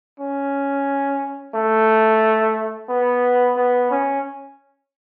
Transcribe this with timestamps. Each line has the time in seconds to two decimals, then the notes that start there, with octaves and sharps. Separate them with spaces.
0.20 C#4
1.55 A3
2.89 B3
3.57 B3
3.91 C#4